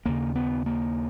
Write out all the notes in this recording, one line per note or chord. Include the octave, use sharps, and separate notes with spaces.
D#2 C#3 A#3
B3
A#3